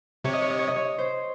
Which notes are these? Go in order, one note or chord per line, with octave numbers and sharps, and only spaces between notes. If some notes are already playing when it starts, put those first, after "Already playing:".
C3 C#5
D#5
C#5
D#5
C#5
D#5
C#5
C5